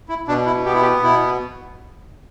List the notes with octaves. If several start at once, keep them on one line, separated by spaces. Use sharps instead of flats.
E4
B2 D4
E4
B3 G4
E4
G4
B2 E4